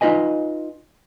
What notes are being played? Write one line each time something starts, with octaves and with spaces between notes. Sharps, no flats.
D#4 F4 B4 D#5 G#5